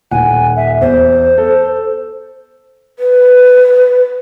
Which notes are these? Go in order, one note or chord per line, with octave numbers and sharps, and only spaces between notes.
D#1 F#5 G#5
E5
E2 C5
A4
B4